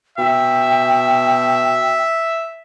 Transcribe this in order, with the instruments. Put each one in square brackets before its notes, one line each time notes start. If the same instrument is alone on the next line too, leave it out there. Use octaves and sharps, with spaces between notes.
[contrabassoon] B2 [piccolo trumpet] E5 [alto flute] G5